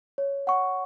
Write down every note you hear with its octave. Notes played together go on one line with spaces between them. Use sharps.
C#5
F#5 C#6